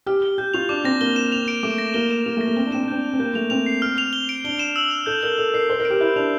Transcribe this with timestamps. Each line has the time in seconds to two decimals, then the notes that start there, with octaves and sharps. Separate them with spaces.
0.06 G4 F6
0.22 G7
0.38 G4 G6
0.54 F4 F7
0.69 D4 D6
0.84 C4 A#6
1.01 A#3 G7
1.16 E7
1.32 F7
1.48 D7
1.63 A3 D6
1.78 A#6
1.94 A#3 G7
2.11 E7
2.25 A#3 F7
2.37 A3 A#6
2.47 A#3
2.56 C4 G7
2.66 D4
2.72 C4 E7
2.83 D4
2.88 C4 G6
3.04 F7
3.13 C4
3.19 A#3 G6
3.35 A3 F7
3.50 C4 F7
3.66 C7
3.82 F6
3.98 F7
4.13 G7
4.29 D7
4.44 D4 G7
4.59 E7
4.76 E6
4.91 F7
5.06 A4 G6
5.23 A#4 G7
5.38 A4 F7
5.54 A#4 C7
5.70 C5 G7
5.80 A#4
5.85 D7
5.90 G4
6.01 E4 G6
6.16 D4 F7